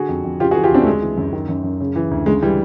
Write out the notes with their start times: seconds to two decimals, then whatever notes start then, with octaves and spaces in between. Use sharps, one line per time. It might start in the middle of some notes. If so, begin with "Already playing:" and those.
Already playing: D3 F#4 G#4
0.09 F2
0.24 F2
0.40 C#3 F4 G4
0.51 F#4 G#4
0.55 E3
0.64 F4 G4
0.71 D2 C4 D4
0.82 A3
0.87 C#3 G#3
1.02 E3
1.18 F#2
1.33 D#3
1.49 F#2
1.64 F#2
1.80 C#3
1.96 E3
2.11 D2
2.26 C#3 G#3
2.42 E3 G3